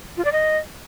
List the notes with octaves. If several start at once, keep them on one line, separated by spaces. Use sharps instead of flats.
F4
D5
D#5